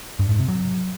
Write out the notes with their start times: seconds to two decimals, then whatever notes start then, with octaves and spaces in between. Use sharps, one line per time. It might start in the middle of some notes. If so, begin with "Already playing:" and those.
0.19 G2
0.29 G#2
0.39 C3
0.48 F#3